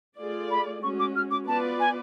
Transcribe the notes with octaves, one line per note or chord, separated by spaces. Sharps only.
A3 F4 G#4 D5
B5
G#3 C#4 F#4 C#6
D6
F6
D6
B3 F4 B4 D5 A5
G#5